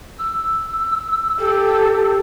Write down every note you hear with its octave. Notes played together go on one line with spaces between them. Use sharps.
E6
G4 A4